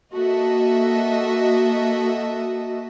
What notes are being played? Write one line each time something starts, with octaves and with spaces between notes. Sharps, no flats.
A#3 F#4 A4 D#5 E5